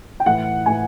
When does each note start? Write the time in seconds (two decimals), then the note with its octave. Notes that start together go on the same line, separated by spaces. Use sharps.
0.20 G5
0.26 A2 E3 F#5
0.66 A2 E3 G#5